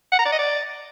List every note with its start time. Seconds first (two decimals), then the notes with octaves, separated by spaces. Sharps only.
0.12 F#5
0.19 A#5
0.25 D5
0.32 D#5
0.39 D5